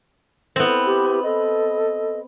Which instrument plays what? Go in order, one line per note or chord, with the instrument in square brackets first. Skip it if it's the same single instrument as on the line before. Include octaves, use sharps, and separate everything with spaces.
[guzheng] B3 C4 [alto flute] E4
[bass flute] G4
[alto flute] A4 [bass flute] D#5